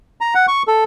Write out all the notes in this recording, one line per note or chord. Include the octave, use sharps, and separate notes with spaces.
A#5
F#5
C#6
A4